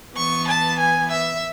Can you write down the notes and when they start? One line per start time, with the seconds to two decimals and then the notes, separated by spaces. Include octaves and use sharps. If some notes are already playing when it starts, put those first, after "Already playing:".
0.16 E3 B3 C#6
0.47 A5
0.79 G#5
1.11 E5